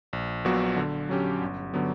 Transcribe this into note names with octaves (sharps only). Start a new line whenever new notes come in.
A#1
A#2 F#3 B3 F#4
D3
F#3 C#4 G4
G1
D3 F#3 B3